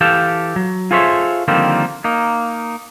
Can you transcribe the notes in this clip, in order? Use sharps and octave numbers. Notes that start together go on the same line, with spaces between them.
E3 G4 A4 F5 G5 A5
F#3
F4 G#4 A4 C5 C#5 E5
D3 D#3 F3 G3 A#3 C4
A#3 D#4